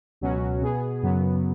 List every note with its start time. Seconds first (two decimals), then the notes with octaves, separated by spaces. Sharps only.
0.21 C#2 B2 F#3 C#4 F#4
0.62 B2 B3 G#4
1.03 F#2 C#3 F#3 B3